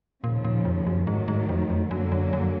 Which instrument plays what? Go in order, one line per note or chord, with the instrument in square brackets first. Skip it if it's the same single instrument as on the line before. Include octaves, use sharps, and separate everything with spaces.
[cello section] D#2 C#3 F3 [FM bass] A#2
[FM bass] A#2
F2
F#2
[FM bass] G#2 [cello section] D#3 F#3 A3
[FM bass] G#2
F2
F2
[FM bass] F#2 [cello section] D3 F#3 A#3
[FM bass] F#2
F#2